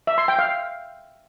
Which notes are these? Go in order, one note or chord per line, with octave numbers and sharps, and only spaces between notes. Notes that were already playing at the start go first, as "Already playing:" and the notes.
E5
C6
G5
F5